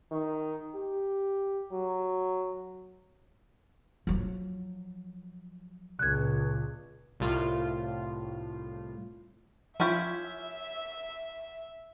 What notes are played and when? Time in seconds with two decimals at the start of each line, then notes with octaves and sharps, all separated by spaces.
0.11 D#3
0.74 G4
1.72 F#3
4.07 F3 F#3
5.99 C#2 A#2 F#6 G#6
7.20 C2 A2 F4
9.80 F3 C#4 E4 F4 G4 E5